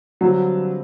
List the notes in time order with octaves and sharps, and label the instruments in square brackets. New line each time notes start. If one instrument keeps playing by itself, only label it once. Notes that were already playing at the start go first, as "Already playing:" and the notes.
[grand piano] G2 D3 G3 C4 [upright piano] F#3